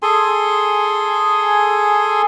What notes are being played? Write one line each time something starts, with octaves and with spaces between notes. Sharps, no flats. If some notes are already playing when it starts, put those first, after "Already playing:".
G#4 A4 G#5 C6